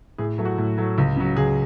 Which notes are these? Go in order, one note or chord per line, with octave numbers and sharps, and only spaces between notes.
A2 G#4
F#3 A3
F#4
A2
F#3 A3
C#2
C#3 F#3
C#2 G#4